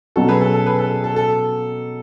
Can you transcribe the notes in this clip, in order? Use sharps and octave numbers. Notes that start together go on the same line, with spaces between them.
B2 F#3 C#4 F#4 A4
G#4 B4
A4
A4
G#4 B4
A4
A4
A4